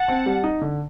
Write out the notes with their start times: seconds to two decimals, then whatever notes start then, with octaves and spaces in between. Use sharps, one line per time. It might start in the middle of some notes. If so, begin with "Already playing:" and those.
Already playing: F#5 A5
0.08 C4
0.26 G3
0.44 D#4
0.61 D3